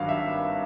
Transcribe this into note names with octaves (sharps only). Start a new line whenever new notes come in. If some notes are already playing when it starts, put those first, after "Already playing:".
Already playing: G#1 G2 D#3 F#3 F5
E5